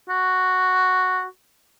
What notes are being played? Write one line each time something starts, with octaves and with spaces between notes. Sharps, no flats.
F#4